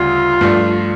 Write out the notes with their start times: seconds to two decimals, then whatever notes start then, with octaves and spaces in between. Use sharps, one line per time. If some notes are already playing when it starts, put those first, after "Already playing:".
Already playing: D2 C#3 G3 F4
0.41 G2 F3 A3 D4